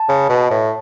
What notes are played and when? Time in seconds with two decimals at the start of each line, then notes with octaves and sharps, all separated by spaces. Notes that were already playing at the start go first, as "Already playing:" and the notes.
Already playing: A5
0.09 C#3
0.29 B2
0.50 A2